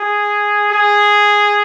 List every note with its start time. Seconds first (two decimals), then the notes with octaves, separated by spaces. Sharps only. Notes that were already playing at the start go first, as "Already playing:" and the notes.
Already playing: G#4
0.72 G#4